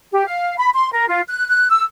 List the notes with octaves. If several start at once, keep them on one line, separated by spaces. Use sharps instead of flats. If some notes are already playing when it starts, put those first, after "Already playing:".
G4
F5
B5
C6
A#4
F4
F#6
F#6
E6